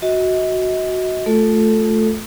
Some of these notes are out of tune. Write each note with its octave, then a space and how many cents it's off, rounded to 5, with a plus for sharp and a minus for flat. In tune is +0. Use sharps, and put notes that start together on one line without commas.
F#4 +0 D#5 +40
A3 -10 F4 +25 A4 +0